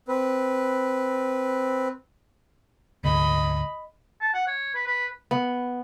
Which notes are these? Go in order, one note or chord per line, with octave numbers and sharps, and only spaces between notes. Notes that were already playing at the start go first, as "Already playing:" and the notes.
C4 B4
D2 G#2 D#5 B5
A5
F#5
C#5
B4
B4
B3